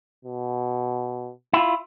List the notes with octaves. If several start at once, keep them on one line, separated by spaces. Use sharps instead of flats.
B2
E4 F4